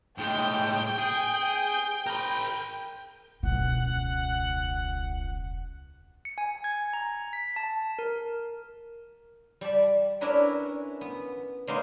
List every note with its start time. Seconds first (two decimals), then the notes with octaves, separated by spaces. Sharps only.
0.18 A2 G#3 G5 G6
0.98 G#4
2.07 A#4 B5
3.43 E1 C#2 C#3 F#5
6.25 C#7
6.38 G#5
6.64 G#6
6.93 A#5
7.33 B6
7.56 A5
7.99 A#4
9.61 G3 D5 A5 B5
10.21 C#4 D4 E4 A#4 B4 C#5
11.01 B3
11.67 C#3 G#3 A#3 B3 D#4 C6